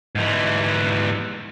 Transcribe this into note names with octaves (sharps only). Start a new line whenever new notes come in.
G#2 E3